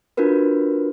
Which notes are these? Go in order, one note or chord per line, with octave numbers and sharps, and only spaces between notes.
D4 F4 F#4 A#4 B4